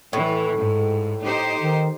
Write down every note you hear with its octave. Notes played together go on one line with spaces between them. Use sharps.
A2 E3
G#2
D#4 G4 C5
D#3